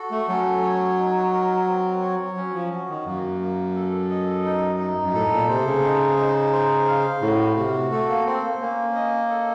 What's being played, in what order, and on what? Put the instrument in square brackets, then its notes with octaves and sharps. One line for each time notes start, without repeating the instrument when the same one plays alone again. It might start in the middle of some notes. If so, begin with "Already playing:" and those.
Already playing: [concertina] F#4 A4
[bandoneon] A3
[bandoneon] F#3 [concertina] C#4
[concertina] C#5
D#4
A#4
C4
C#5
[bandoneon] F#3 [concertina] C#4
[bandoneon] F3
[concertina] F#4
[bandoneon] D#3
[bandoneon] F#2 [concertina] A#3
[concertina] A#3
A4
D#5
D#4
D#4
[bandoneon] F#2
[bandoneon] A2 [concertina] A4
[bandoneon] A#2
[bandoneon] C3 [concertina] C5
[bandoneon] C#3
[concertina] D#4
D#4
C5
F5
[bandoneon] A2 [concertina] F#4
[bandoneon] C3 [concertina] F#4
[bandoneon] A3 [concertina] A4
[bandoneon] A#3
[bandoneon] C4 [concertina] C5
[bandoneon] A#3
[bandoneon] A#3 [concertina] C#4
[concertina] D#5
A4